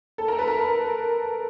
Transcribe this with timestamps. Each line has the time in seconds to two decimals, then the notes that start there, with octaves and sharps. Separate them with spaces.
0.18 A4
0.28 A#4
0.39 B4
0.48 A#4